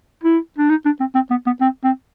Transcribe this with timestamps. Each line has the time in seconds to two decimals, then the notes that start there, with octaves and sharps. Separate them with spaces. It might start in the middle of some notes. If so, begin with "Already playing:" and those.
0.24 E4
0.58 D4
0.69 D#4
0.85 D4
1.00 C4
1.15 C4
1.30 B3
1.46 B3
1.61 C4
1.84 C4